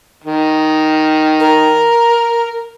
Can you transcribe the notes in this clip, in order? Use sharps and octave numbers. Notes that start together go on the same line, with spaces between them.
D#3
A#4